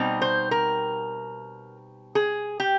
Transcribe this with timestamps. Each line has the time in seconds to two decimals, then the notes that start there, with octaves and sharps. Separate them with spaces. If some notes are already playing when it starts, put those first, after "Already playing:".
Already playing: B2 G3 C4 D#4
0.22 C5
0.51 A#4
2.15 G#4
2.60 G4